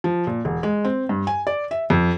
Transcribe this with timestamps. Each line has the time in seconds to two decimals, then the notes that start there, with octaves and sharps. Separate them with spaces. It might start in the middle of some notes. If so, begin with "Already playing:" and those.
0.04 F3
0.27 A#2
0.45 E1
0.63 G#3
0.85 C4
1.09 G2
1.27 G#5
1.47 D5
1.71 E5
1.90 F2